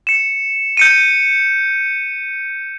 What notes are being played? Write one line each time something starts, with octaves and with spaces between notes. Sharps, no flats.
C#7 E7
G6 C#7 D#7